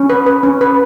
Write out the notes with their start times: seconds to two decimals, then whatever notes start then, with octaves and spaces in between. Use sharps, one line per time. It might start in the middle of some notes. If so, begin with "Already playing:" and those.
Already playing: C#4
0.10 B4
0.26 B4
0.43 C#4
0.61 B4